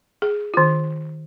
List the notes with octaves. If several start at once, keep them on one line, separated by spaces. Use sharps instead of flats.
G#4
D#3 F4